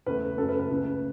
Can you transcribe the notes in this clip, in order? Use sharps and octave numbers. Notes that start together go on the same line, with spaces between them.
E2 C#3 A3 B4
F#2 C#3 A3 A4
B4
B4
C#2 C#3 A3